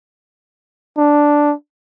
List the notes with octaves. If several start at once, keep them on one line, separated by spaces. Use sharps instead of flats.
D4